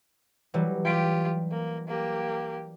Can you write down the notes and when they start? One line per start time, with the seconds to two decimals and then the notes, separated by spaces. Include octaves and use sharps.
0.54 E3 F#3 G3
0.85 F4 G4 G5 B6 D7
1.51 A#3
1.88 A#3 G4